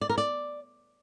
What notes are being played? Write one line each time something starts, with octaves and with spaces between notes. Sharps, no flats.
D5
A#4
D5